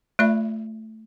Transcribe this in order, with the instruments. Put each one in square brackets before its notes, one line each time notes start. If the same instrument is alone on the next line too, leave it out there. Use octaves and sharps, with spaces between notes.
[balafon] A3 F4 D5 E5 B5